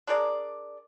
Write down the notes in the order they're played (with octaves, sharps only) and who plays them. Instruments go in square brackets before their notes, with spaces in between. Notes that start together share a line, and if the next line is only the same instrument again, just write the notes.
[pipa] D4 G#4 A#4 D5